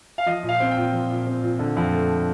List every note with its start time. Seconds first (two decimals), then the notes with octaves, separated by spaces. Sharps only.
0.18 F5
0.26 F3 D#5
0.43 A#2
0.49 F5
0.60 C4
0.71 G5
0.77 A#2
0.93 F3
1.10 A#2
1.27 C4
1.43 A#2
1.59 D3
1.77 F2
1.93 A3